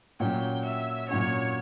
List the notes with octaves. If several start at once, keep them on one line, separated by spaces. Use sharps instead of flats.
A#2 F#3 C#4 G5
E5
A#2 F#3 C#4 C#5